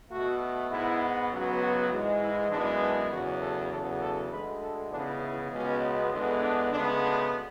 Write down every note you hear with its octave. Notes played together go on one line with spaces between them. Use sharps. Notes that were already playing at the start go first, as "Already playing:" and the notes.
B2 A3 F#4
G#2 G#3 B3 E4
C#2 C#3 F#3 B3
F#4
G#2 E3 G#3
E4
F#2 E3 G#3 B3 D4
D4
E2 C#3 F#3 F#4
A4
E2 C#3 F#3 A4
A4
D2 D3 G#3 B4
A4
C#2 C#3 E3 B3 D4
E4
C#2 B2 G#3 B3 C#4
E2 D3 G#3 B3
D4
D2 C#3 G#3 B3 D4
D4